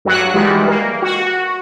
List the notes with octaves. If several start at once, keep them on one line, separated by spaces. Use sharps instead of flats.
G2 F#3 F#4 F#5 F#6
D#3 E3 G3 G#3
A#3
F#4